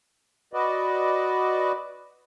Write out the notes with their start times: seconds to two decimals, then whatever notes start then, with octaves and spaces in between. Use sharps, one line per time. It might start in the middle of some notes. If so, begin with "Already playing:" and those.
0.53 F#4 B4 D5 D#5